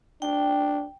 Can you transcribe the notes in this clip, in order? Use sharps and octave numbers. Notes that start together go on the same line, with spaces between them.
D4 G5